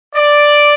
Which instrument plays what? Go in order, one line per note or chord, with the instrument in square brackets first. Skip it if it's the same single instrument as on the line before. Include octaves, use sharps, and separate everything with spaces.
[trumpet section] D5